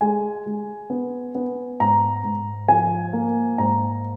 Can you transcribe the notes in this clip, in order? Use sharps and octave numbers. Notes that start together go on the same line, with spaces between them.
G#3 G#5
G#3
B3
B3
G#2 A#5
G#2
F3 G#5
A#3
G#2 A#5